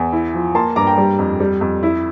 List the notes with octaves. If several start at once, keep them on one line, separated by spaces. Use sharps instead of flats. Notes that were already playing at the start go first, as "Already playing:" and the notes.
Already playing: E2
E4
F3
A#3 A5 C6
G2 A#5 D6
G5 A#5
G3
F2
G3
F2
E4